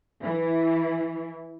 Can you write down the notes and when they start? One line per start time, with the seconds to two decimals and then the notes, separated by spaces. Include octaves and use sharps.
0.23 E3